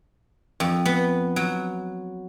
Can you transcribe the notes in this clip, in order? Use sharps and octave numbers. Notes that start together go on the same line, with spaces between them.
F2
B3
F#3